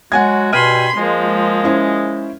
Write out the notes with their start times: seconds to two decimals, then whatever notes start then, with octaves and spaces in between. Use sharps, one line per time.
0.12 F#3 G#3 F#4 F#5 G#5 G#6
0.53 G2 B2 G5 G#5 B5 C6 F6 D#7
0.96 F3 G#3 A#3
1.64 C#4 E4 C5